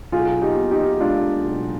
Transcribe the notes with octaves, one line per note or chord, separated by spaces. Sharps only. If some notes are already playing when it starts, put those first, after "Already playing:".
B1 F4 G#4
D#4 G4
B2
D#4 G4
G#3 D4 F4
B1